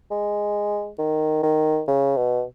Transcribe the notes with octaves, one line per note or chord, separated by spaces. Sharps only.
G#3
D#3
D#3
C#3
B2